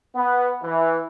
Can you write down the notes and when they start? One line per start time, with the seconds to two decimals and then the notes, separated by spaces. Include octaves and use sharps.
0.16 B3
0.63 E3